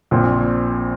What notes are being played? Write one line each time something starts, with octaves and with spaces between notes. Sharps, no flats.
A#1 A#2 F3 C4